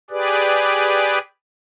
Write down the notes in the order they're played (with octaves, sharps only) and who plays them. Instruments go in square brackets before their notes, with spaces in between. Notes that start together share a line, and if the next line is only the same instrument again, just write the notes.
[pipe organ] G4 G#4 B4 D5